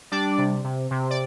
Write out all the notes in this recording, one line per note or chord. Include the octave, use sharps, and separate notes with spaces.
G3 D4 D5
C3
C3
C3
D5